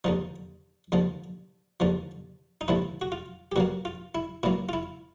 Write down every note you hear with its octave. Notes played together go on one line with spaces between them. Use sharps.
D#2 D3 F3 D#4
D#2 D3 F3
D#2 D3 F3
D#4
D#2 D3 F3 E4
F#4
F4
G4
A#2 F#3 A#3 F#4
F4
E4
A#2 F#3 A#3 E4
F4
E4